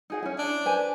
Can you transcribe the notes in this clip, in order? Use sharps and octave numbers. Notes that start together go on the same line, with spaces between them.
D#4 G#4 F#5
C#4 E4
D4
B4 C5 G#5